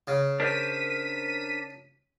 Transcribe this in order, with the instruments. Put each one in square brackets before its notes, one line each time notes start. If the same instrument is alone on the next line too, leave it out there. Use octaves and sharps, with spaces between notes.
[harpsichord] C#3
[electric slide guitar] D4 A#4 C5 [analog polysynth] B6 D#7